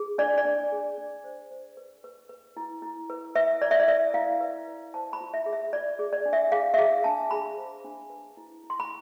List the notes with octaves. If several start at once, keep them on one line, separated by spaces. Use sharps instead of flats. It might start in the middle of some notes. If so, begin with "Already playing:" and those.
Already playing: G#4
D4 D5
D5
D4
G#4
D4
C5
C5
B4
B4
B4
E4
E4
B4
B4 E5
E4 D5
E5
D5
B4 E5
E4 F5
B4
B4
C5 A5
B5
F4
E5
G#4
E5
F4 D5
G#4
D5
D4
E5
G#4 F5
E5
G#4 F5
D4 A5
G#4 B5
C5
D4
B4
E4
E4
C6
B5